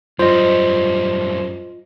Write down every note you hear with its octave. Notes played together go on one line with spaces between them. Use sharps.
F#2 G3 F4 C5 D#5